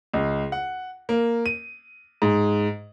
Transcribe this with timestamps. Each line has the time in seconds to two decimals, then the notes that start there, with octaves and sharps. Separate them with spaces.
0.13 C#2
0.52 F#5
1.09 A#3
1.46 D#7
2.22 G#2